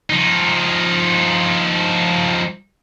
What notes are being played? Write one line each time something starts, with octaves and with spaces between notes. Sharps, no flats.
F3 D#4